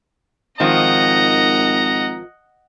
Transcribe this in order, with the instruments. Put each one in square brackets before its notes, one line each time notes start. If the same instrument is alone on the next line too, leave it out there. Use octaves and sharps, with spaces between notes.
[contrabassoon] G#1 [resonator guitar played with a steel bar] D#3 F3 [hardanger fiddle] D#5 F#5 [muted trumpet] A#5